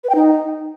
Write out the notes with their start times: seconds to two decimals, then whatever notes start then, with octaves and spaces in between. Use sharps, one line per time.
0.04 B4
0.10 G5
0.15 D#4